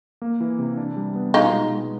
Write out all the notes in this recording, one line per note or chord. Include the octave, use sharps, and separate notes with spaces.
A#3
E3
C3
D4
G3
B3
B2 D#4 F4
G#3
G#3